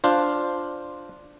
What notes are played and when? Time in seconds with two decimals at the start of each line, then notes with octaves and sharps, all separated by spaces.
0.04 D4 F4 C5